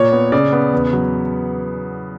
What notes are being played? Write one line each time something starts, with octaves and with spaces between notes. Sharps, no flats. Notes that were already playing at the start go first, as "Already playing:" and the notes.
Already playing: A#2 C#5
B3
C#3 D5
B3
E2
F#3